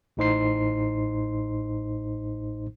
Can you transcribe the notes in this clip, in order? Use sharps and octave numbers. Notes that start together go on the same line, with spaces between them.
A1 A2 D#4 C5 C6 C7